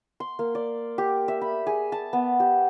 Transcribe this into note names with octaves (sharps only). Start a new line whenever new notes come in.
C6
A#3
D5
G4
E5
B5
G#4
A5
B3
G4